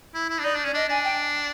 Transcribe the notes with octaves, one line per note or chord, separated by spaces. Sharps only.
E4
E4
D4
D#4 D5
D4
C#4
D4 D#5
D4 G#5
G5